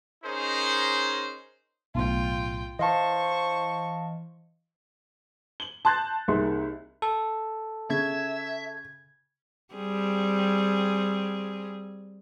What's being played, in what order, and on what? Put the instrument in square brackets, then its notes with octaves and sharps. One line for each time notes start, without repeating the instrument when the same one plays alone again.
[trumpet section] C#4 D#4 G#4 A#4 C5
[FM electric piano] B1 A2 [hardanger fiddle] F4 G5
[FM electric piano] E3 [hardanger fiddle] C5 C#6 [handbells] D#5 F5 A5
[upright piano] F#7 G7
A5 C6 F#6 G6 A6
C2 A#3 D#4 G#4 E5 C6
[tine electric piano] A4
[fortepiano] C#3 [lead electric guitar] E5 [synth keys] G#6
[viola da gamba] G3 C4 G#4